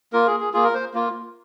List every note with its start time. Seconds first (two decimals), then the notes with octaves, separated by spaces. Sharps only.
0.13 A#3 F4 A#4
0.27 G#4
0.40 G#4
0.53 A#3 F4 G#4
0.64 A#4
0.74 C5
0.94 A#3 F4